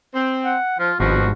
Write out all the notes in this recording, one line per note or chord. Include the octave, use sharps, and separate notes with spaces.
C4
F#5
F3 F4
G#1 G2 B2 F3 F#4